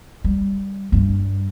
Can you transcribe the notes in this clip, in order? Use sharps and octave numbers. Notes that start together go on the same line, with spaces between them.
G3
G2 G3